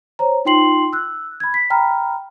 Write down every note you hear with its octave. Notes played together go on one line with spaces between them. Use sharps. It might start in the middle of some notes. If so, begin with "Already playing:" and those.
C5 C#5 A#5
D#4 F4 G5 C6 C7 F#7
E6 F#6
B5 G#6
B6
G5 A#5 B5 F6